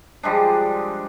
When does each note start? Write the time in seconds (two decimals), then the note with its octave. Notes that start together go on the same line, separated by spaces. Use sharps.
0.23 F3 G3 G#3 D4